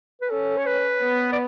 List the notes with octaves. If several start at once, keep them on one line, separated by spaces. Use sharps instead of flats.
B4
C#4 A4
C#5
B4
B3
D5